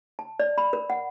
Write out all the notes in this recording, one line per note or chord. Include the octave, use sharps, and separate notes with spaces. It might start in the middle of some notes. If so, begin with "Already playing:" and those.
A5
D5
B5
A#4
F#5